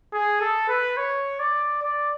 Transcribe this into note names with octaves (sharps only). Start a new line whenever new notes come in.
G#4
A4
B4
C#5
D5
D5